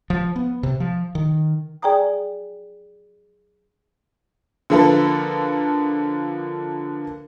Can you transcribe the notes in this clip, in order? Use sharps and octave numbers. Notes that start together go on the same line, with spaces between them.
F3
B3
C3
F3
D#3
G#4 D5 G5 G#5 A#5 D#6
D3 F3 A#3 A4 B4